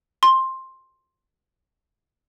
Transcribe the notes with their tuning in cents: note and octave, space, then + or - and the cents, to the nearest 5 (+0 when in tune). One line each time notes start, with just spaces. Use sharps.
C6 +10